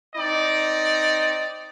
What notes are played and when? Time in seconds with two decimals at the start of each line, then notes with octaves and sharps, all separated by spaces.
0.16 C4 D#4 D5